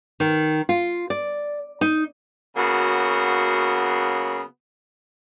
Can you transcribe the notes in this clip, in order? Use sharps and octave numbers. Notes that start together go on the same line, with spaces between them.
D#3
F4
D5
D#4
C#3 F#3 A#3 B3 F#4